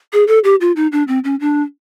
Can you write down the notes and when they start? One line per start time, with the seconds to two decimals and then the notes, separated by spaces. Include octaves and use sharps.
0.13 G#4
0.28 A4
0.44 G4
0.61 F4
0.76 D#4
0.92 D4
1.08 C4
1.24 C#4
1.40 D4